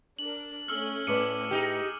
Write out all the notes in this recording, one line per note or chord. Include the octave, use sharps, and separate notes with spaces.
D4 A#4 F#7
A3 C#4 E6 F6
A2 B4 D5 D6 C#7 D#7
D#4 G4 G#4